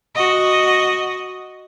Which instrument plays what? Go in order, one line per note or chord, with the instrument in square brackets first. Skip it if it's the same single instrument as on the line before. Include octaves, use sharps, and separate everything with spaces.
[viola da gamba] F#4 D#5